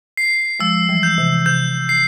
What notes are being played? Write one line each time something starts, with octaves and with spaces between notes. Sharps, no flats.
C7
F3 G#3 E6
E3 G3
G6
C3 E3
C3 G6
C7